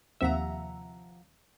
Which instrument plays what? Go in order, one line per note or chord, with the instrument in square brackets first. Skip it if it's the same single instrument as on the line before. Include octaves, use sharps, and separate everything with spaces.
[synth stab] D#2 C3 E5 [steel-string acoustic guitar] F3 F#5 A#5